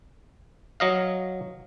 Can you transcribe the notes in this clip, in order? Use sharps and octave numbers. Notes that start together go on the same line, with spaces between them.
F#3 D#5 F5